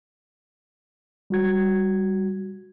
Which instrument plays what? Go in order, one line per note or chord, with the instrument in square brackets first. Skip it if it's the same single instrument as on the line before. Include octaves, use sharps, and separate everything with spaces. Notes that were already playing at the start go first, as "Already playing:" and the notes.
[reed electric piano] G3 F#4 G#6